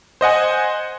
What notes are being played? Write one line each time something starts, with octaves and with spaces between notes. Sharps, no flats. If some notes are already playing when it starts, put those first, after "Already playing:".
C5 D#5 F#5 G#5